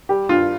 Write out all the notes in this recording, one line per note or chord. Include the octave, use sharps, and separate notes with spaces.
G3 G4
G2 F4